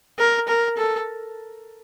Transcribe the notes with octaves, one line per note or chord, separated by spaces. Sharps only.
A#4
A#4
A4